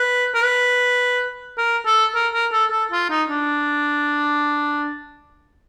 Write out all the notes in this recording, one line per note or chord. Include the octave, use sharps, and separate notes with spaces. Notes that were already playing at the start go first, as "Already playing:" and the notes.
Already playing: B4
A#4
B4
A#4
A4
A#4
A#4
A4
A4
F4
D#4
D4